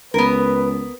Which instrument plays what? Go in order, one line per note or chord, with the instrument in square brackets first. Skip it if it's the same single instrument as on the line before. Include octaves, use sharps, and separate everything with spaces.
[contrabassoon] C#2 [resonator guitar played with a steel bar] B3 A#4 [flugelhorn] B4